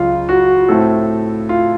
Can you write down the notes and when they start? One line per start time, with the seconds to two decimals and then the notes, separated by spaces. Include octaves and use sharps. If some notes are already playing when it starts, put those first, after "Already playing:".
Already playing: C#2 C#3 F#3 F4
0.29 F#4
0.68 A2 A3 C4 A4
1.49 F4